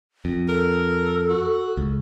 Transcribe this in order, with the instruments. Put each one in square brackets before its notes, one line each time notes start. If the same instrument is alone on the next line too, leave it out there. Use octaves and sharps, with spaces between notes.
[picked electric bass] F2
[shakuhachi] A4 [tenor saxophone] A#4
[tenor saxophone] F#4
[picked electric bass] C#2